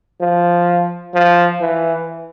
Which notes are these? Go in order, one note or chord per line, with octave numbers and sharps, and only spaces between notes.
F3
F3
E3